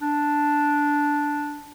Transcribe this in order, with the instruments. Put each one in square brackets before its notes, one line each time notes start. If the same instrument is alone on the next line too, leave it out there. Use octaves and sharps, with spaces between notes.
[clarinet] D4